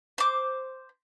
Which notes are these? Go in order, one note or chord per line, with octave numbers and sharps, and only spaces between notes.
C5 D6